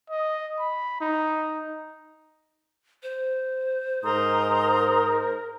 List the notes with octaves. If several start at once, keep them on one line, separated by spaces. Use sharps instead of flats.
D#5
B5
D#4
C5
G#2 A#4 A#5 C6 D#6